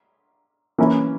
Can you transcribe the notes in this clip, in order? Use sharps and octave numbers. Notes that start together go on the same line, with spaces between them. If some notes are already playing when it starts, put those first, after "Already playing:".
E3 A#3 C#4 E4